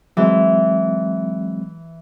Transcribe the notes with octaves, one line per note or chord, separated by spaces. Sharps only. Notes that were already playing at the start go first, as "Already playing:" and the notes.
E3 F#3 G#3 C4